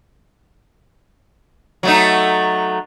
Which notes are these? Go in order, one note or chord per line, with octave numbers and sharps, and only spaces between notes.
F#3 A3 D#4